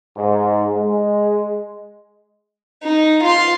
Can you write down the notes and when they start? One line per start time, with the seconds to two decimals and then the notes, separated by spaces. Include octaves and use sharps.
0.17 G#2
0.76 G#3
2.83 D#4
3.23 F4 C6